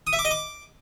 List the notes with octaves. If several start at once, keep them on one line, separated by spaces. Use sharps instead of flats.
D#6
E5
D6
D#5
D6